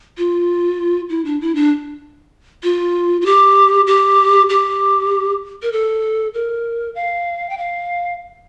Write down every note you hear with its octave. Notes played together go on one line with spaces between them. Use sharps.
F4
E4
D4
E4
D4
F4
F4
G4
G4
G4
A#4
A4
A#4
F5
G5
F5